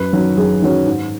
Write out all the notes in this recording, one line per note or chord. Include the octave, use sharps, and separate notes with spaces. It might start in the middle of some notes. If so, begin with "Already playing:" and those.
Already playing: F#2 B4
D#3 F#3 C#4
F#2 G#4
D#3 F#3 C#4
G#2